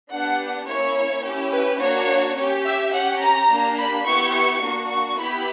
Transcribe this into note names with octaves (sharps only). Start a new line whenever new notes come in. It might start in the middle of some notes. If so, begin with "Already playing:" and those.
B3 D4 G4 F#5
A#3 C#4 E4 C#5
C#4 E4 G4
B4
A#3 D4 F#4 C#5
C#4 G4
E5
C#4 G4 F#5
A#5
A#3 D4 G4
B5
B3 E4 G4 C#6
C#6
A#3 D4 F#4
C#6
B3 E4 G4 B5